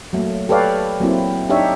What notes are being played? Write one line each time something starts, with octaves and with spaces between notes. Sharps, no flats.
F#3 A3 A#3
G4 A4 B4 C#5 D5 F5
F#3 A#3 C4 E4
D4 D#4 G4 C#5 E5